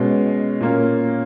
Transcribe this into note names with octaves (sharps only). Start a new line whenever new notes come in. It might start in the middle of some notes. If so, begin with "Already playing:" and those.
Already playing: B2 G#3 C#4
A#2 A#3 C#4